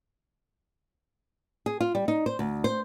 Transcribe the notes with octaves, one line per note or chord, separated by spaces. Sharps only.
G#4
F4
G3
D#4
C5
D2
C5